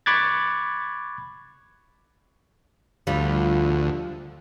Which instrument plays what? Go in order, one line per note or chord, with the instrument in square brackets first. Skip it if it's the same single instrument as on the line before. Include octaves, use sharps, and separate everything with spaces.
[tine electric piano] B5 C#6 D6 F#6 G#6 A6
[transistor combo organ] D2 [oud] F3 G3